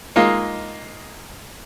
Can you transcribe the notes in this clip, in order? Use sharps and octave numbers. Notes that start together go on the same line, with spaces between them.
G#3 A#3 D#4 F4